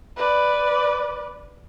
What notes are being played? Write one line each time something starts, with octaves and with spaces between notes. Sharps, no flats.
B4 D5